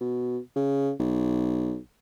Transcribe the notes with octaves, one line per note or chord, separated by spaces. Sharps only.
B2
C#3
B1